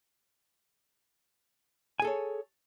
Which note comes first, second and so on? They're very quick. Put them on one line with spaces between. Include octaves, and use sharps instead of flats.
G#5 G#4 A4 C#5